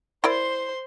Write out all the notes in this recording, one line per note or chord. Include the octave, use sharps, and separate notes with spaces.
E4 A#4 C5 D5 C6